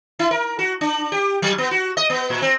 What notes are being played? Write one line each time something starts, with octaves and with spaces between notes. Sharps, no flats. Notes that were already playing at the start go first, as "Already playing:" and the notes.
E4
A#4
F#4
D4
G4
F#3
B3
F#4
D#5
B3
A#2
C4